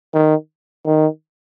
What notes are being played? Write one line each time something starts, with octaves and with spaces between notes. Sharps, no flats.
D#3
D#3